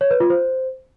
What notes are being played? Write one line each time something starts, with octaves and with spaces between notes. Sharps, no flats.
C#5
B4
F4
C5